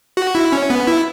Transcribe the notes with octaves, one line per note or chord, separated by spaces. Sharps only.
F#4
E4
C#4
B3
E4